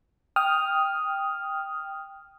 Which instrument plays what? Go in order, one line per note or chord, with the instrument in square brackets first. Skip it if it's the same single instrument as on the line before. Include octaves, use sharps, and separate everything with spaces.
[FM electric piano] G5 D#6 F6